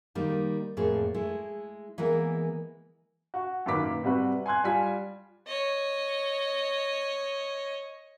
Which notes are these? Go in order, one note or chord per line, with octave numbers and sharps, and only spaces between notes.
D#3 G3 A#3 D#4
F2 A2 A#3 G#4
G#3 A3 E4
E3 G#3 A#3 B3 E4 A#4
F#4
F#2 A#2 D#3 B4 D6 B6
C3 G3 F#4 B4
G#5 C6 F#6 G#6
G3 F4 G#5 B6
C#5 D#5